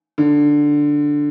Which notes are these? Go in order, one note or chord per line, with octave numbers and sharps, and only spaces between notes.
D3